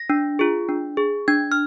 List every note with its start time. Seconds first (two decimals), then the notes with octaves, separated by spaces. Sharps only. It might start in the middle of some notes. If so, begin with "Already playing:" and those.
Already playing: A#6
0.10 D4
0.39 F4 G#4
0.69 D4
0.97 G#4
1.28 D4 G#6
1.52 F6